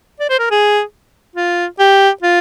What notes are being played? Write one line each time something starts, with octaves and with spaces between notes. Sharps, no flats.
D5
C5
A#4
G#4
F4
G4
F4